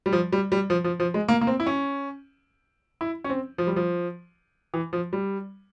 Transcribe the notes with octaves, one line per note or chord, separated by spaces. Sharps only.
G3
F3
G3
G3
F3
F3
F3
G#3
A#3
A#3
C4
E4
C#4
E4
C#4
C4
F3
G3
F3
E3
F3
G3